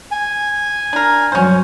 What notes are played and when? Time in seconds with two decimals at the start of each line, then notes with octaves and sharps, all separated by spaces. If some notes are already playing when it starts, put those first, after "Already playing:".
0.11 G#5
0.93 D4 A#4
1.32 G2 F#3 C#4 C5